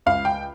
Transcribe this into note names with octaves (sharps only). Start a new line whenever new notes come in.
C#2 F5
G5